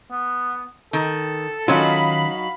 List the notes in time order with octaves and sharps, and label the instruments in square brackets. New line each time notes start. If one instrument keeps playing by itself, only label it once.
[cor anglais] B3
[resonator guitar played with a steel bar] D#3 [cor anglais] A4
[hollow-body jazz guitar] D#3 C#4 F4 [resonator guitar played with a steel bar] F#3 D#4 F#4 [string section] F5 B5